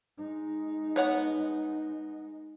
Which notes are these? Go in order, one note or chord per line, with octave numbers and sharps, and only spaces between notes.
G#3 D#4
B3 C#5 F#5